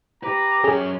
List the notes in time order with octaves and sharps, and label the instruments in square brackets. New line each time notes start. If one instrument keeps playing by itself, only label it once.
[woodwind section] G4 D6 [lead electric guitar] B4 [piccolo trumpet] A#5
[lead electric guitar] F#3 C#4 [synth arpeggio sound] G#4